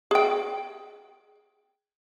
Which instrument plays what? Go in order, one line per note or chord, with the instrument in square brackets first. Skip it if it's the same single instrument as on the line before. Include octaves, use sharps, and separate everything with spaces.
[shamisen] G#4 G5